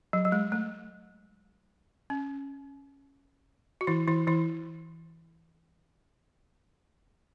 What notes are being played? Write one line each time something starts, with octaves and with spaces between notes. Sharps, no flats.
F#3
F#3
G#3
A3
C#4
F#4
E3 E4
E3 E4
E3 E4